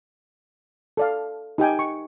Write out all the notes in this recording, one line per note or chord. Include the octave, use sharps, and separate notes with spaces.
A4 D5 F5
D#4 G4 G5 G#5
C#6